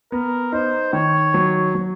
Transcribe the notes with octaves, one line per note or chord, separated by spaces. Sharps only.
B3 A#4
D#4 C5
D#3 C#5
F#3
F#3